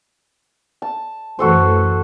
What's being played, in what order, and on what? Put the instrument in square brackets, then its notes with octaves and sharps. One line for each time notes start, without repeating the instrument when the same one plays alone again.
[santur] A5
[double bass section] F#2 E3 A3 [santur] F#4 A4 C5